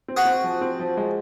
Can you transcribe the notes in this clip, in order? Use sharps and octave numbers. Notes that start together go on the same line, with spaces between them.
C4
F#4 G#4
C4
F3
C4
F3
G#3